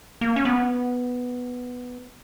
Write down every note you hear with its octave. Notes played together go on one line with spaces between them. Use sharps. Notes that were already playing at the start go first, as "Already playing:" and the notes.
A#3
C#4
B3